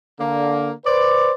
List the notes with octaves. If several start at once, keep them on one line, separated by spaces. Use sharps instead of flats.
D3 A#3
B4 C5 D5